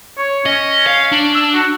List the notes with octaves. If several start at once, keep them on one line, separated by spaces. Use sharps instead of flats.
C#5
C#4 D#5
F5
D4
E6
F#4